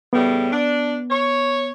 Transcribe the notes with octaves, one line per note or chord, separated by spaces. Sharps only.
A2 C#3 G3 B3
D4
C#5